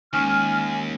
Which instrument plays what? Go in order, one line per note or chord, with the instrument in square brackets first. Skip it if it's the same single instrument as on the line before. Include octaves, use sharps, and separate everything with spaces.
[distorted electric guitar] D#2 [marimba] G#3 C#4 D#4 [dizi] G#5 [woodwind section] F6